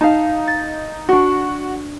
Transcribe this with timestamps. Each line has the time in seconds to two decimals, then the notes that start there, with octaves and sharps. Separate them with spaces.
0.01 D#4 F5 A5
0.47 A6
1.09 D4 F#4 C#6